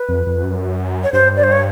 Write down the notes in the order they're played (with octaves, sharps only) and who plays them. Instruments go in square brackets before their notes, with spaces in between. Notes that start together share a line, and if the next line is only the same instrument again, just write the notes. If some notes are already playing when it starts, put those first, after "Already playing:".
Already playing: [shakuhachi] B4
[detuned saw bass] F2
F2
F#2
[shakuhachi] C#5
[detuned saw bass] G2 [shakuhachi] C5
[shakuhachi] D5
C5
C#5